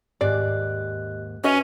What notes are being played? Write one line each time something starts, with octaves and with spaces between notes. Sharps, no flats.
D#2 G#2 G4 D5 D#5 F#6
C#4 F#4 B4 D#5 E5 D#7 F7